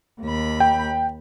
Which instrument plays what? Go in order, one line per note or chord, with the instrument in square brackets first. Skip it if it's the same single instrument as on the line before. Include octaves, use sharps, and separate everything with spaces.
[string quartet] D#2 B5
[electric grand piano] G5